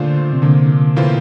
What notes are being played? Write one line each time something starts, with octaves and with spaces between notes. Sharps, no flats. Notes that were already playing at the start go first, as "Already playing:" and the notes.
Already playing: A#2 D3 A3 D4 F4 C5
C3
A#2 D3 F3 A#3
A2 E3 A#3 F4 C5